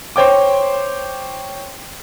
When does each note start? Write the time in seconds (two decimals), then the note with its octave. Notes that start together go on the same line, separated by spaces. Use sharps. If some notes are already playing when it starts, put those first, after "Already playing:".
0.16 C5 C#5 G5 D6